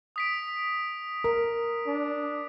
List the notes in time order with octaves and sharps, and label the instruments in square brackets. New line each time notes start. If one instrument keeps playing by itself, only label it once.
[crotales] D#6 B6 D7
[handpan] A#4
[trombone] D4